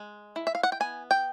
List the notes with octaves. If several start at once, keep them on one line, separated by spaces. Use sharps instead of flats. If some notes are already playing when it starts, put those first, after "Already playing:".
Already playing: G#3
E4
E5
F5
F#5
G5
B3 G#5
G5